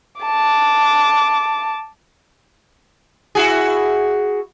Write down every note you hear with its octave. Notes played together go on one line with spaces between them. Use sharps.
A5 D6
E4 F#4 G#4